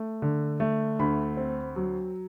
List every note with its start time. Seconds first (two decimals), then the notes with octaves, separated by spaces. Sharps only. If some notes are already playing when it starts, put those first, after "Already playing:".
Already playing: A3
0.22 D3
0.60 A3
0.99 D2 B5
1.37 C4
1.76 F#3